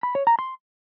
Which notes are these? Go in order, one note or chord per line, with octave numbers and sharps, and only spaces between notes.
B5
C#5
A#5
C6